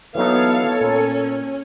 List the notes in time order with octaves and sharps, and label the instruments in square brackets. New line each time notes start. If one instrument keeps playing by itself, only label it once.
[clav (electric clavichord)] E3 F#3 D#4 [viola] B3 F5 [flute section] A4 C#5
[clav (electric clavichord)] A#2 [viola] C#4